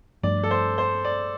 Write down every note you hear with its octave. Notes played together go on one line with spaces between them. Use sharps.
G2 F3 A3 D4 D5
A4
C5
C5
D5